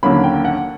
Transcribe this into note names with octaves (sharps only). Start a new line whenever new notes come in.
D#2 D3 F#3 A#3 C#4 B5
G5
F#5